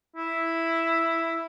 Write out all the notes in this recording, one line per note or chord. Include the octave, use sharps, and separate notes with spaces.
E4